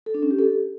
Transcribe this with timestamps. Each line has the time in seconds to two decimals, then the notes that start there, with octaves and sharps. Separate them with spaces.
0.06 A4
0.14 D4
0.22 C#4
0.31 G4
0.39 A4